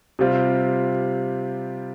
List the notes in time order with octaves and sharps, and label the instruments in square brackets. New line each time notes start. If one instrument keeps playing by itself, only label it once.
[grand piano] C3 G3 C4 F4